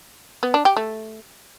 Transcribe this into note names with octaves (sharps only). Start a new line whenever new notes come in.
B3
D4
G4
A3